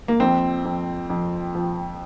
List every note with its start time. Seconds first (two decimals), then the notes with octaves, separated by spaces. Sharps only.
0.08 A#3
0.20 F2 C4
0.65 F2
1.10 F2
1.55 F3